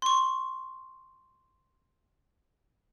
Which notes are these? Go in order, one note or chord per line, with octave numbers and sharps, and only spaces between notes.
C6 C#6